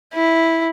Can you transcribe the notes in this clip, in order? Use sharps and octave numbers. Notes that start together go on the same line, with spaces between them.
E4